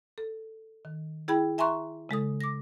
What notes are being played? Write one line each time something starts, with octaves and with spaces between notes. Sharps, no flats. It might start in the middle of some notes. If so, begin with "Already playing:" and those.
A4
D#3
E4 G#4 G5 B5
E5 G#5 A#5 C6 C#6 F#6
C#3 G#3 A4 D#6
D6 A#6